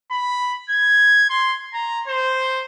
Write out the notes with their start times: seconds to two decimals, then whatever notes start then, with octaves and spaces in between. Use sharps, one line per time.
0.11 B5
0.70 G#6
1.30 C6
1.74 A#5
2.07 C5